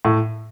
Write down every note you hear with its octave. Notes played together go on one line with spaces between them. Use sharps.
A2